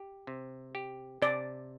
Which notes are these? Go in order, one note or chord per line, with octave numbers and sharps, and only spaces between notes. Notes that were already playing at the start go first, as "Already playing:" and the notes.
Already playing: G4
C3
G4
C3 D5